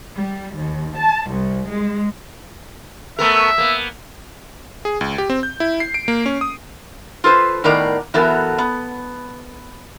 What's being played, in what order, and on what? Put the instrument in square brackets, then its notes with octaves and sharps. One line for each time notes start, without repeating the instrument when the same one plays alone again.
[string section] G3
D#2
A5
C2
G#3
[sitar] A3 B3 A#4 [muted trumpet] E5
[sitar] A#3 B3
[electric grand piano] G#4
C#2
G4
C4
G6
E4
C7
D7
A#3
C#4
D#6
[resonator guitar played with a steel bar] F4 A4 B4 C5
A2 D#3 B3 A#4 D5 A#5
E3 F#3 B3 A4 A#4
B3